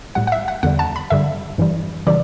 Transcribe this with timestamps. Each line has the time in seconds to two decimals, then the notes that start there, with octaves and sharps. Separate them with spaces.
0.15 A2 G3 F#5
0.27 F#5
0.32 E5
0.48 F#5
0.63 E2 D3 G3 F#5
0.79 A5
0.96 B5
1.10 G2 D3 G3 E5
1.58 G2 E3 G3
2.07 C#3 E3 G3 D5